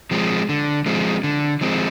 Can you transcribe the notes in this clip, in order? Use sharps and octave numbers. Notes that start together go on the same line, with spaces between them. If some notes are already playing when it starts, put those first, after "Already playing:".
F3 G#3 C4
D3
F3 G#3 C4
D3
F3 G#3 C4